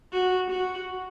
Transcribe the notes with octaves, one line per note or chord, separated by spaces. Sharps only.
F#4
F#4